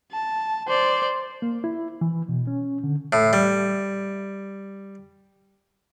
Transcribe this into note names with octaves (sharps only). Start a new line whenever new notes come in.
A5
C5 D5
A#3
E4
E3
B2
C#4
D3
A2
G3